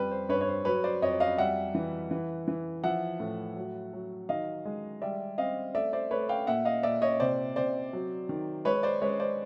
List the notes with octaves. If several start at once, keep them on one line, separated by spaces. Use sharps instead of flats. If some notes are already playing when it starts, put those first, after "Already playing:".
Already playing: F2 G3 B4
C5
G2 B4 C#5
C#5
C5
F#3 B4 C#5
C5 D5
F2 C#5 D#5
D#5 F5
G3 E5 F#5
E3
E3
E3
F3 E5 F#5
A2
F#3
F#3
D#3 D#5 F5
G#3
G3 D5 E5
C4 D#5 F5
A3 D5 E5
C5 D5
A3 B4 C#5
F5 G5
A#2 E5 F#5
D#5 F5
A#2 D5 E5
C#5 D#5
C3 C5 D5
C3 C5 D5
F#3
D#3
G#3 B4 C#5
C5 D5
G#3 B4 C#5
C5 D5